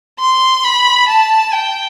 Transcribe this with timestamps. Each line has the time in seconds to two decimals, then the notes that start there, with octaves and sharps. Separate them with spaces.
0.19 C6
0.64 B5
1.08 A5
1.53 G5